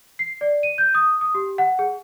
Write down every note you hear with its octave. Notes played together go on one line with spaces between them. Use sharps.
C7
D5
D#7
G6
D#6
D#6
G4
F#5
G#4